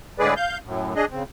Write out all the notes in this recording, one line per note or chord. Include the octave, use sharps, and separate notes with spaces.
A2 D3 G#3 G#4 B4 D5
F5 G6
F#2 A2
D4 G#4 D#5
C#3 C4